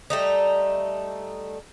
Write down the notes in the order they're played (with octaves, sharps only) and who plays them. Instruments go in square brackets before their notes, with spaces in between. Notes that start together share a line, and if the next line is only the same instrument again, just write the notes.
[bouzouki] G3 A3 D#4